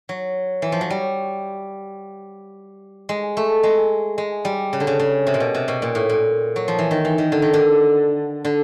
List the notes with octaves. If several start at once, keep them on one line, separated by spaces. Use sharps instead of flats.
F#3
E3
F3
F#3
G3
G#3
A3
G#3
G#3
G3
C#3
D3
C#3
C#3
C3
A#2
B2
C3
B2
A#2
A2
A#2
F#3
F3
E3
D#3
E3
D#3
D3
D#3
D3
D3